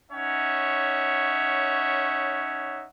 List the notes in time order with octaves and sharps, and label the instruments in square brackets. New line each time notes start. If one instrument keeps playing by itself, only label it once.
[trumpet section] C#4 D#4 C#5 E5 F#5